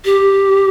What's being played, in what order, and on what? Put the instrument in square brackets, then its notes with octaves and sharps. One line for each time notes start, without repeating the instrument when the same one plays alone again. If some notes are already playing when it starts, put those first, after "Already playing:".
[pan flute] G4